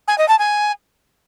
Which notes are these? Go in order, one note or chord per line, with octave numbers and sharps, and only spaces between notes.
G#5
D#5
A5
G#5